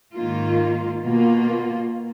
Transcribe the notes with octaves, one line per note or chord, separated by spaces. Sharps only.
G#2 D#3 A#3 F4
B2 A#3 F4